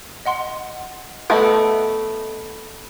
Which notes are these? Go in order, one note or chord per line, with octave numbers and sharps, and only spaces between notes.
D#5 F#5 C6
A3 B3 A4 D#5 F#5 D7